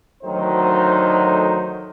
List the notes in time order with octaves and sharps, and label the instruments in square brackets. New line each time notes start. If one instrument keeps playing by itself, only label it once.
[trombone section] D2 D#3 F#3 A3 D#4 C5